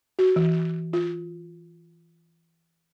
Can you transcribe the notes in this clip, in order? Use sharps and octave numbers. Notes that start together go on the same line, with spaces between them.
F#4
E3
F4